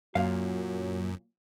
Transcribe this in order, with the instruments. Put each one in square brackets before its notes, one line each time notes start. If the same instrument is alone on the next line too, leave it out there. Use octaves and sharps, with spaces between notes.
[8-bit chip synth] F#2 [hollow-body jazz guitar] A#2 F5 [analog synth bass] F#3 [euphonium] F#4